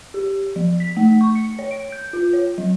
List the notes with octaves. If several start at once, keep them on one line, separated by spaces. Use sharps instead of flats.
G4
F3
B6
A3
C#6
C#7
C#5
D7
G6
F4
C#5
F#3